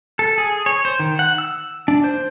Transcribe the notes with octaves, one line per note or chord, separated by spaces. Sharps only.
A4
G#4
C#5
C5
D#3
F#5
E6
D4
C5